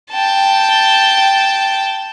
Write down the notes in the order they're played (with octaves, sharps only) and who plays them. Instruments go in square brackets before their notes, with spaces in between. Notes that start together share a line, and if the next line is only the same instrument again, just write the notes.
[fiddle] G5 A5